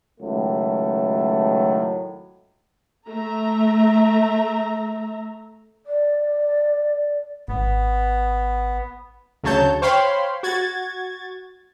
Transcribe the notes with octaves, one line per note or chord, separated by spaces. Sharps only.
C#2 A2 D#3 F#3 A3
A3 E5 A#5
D5
G#1 B3
D2 C#3 F#3 C#5 A5 G6
C5 C#5 F5 G5 B5 C6
F#4 G#6 A6